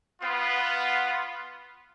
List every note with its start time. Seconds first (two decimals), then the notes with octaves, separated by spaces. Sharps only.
0.22 B3 F4